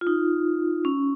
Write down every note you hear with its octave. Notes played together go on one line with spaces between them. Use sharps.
F4
D#4
C#4